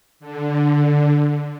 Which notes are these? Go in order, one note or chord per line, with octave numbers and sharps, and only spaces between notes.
D3